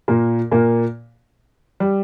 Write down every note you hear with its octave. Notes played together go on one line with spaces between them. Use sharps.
A#2 A#3
A#2 A#3
G3